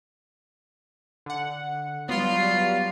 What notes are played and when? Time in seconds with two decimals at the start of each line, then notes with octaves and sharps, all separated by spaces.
1.26 D3 F#5
2.09 F#3 G3 B3 F4 C6